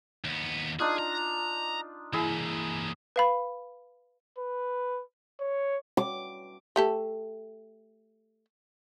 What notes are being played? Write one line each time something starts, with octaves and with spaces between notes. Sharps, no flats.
D#2 B3
D4 D#4 F4 G#4
A#5
E3 A#3 E4 G#4
B4 F5 B5
B4
C#5
D6
A3 G4 A4